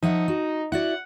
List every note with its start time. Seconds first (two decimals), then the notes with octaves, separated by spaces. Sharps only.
0.03 F3 D#4 E5 F#5
0.28 F#4
0.72 E4 F#4 D5 F#5